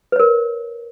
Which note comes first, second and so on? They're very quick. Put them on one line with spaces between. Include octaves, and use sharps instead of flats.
B4 C#5 A#4